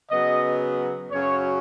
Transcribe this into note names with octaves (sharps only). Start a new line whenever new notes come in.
C#3 F#3 B3 D#5
F#2 C#3 F#3 C#4 C#5